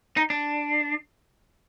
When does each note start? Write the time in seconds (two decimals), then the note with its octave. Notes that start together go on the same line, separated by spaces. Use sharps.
0.17 D#4
0.30 D4